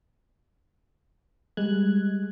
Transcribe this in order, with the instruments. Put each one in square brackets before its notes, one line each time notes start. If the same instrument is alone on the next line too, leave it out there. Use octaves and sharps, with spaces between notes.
[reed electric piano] G3 [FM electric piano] G#3 F#6 G#6